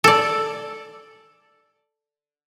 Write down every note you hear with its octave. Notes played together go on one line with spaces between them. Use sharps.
A4 D5